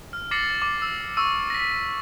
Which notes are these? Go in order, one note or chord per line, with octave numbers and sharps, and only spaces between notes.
F6
D6 A6 A#6 C7 C#7 F#7
D6
E6
C#6 E6 D#7
A#6 B6